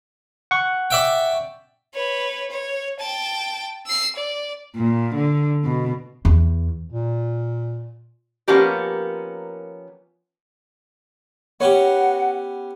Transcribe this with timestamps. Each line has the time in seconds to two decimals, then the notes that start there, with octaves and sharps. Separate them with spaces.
0.51 F#5 C#6
0.90 D5 E5 G5
1.94 B4 C#5
2.50 C#5
3.00 G5 A5
3.86 E6 C7
4.16 D5
4.76 A#2
5.16 D3
5.64 B2
6.25 E2
6.91 A#2
8.48 F3 A#3 B3 C#4 G4 A#4
11.60 B3 C#4 G4 C#5 F#5